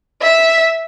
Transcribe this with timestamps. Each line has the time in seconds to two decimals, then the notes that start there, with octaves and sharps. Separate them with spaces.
0.21 E5